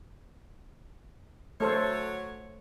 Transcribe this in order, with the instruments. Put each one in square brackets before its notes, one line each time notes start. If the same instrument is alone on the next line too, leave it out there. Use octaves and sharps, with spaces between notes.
[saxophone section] F#3 C#5 [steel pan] A3 A4 C5